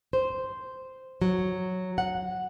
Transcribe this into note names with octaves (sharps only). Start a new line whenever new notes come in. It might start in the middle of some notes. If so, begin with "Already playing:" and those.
C5
F#3
F#5